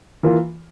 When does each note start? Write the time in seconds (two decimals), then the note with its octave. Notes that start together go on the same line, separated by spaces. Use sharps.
0.23 E3 A#3 F4